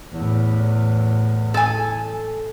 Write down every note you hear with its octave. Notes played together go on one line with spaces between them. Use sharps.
E2 A2
A4 G#5